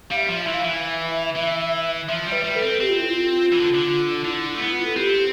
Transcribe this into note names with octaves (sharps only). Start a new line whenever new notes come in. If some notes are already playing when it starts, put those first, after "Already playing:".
G3 F5
E5
F3
E5
E3
F5
E3 E5
E3
F3 E5
G3
B4
G3
A4
C4
C4 G4
F4
E4
F4
E3
D3
D3
D3 E4
E4
A3
B3
F4
A4
C4 G4